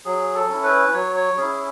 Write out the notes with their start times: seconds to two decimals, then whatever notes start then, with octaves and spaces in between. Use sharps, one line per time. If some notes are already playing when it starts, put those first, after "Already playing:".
0.05 F#3 G#4
0.35 A4
0.49 C#4 E4
0.63 B4
0.93 F#3 C#5
1.15 C#5
1.37 C#4 E4 G#4